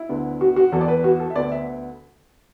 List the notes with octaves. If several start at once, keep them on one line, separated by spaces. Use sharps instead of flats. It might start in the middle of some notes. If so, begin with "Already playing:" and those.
Already playing: E4
D2 D3 B3
F#4
F#4
E2 E3 B3 A4
D5
B4
F#4
A4
E5
D2 D3 B3 D5
E5